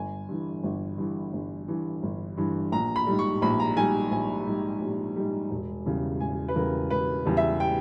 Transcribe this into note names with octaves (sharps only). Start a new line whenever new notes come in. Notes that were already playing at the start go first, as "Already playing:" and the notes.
Already playing: G1 G#5
G2 E3
G1
G2 E3
G1
G2 E3
G1
G2 E3
A#1 A#5
B5
G#2 G3
C#6
A#1 B5
A#5
G#2 G3 G#5
A#1 G#5
G#2 G3
A#1
G#2 G3
E1
E2 C#3 G3
E1 G#5
B4
E2 C#3 G3 A#4
E1 B4
E2 C#3 G3
E5
G5